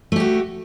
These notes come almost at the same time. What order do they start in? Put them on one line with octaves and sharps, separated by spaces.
A3 G4 F#4